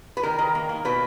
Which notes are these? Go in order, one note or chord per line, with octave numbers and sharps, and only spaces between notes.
B4
D#3 A#4
D#3
A#3
A#3
B2 B4